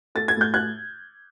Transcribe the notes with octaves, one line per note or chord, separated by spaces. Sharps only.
A3 A6
G#6
A2 G6
F#6 G#6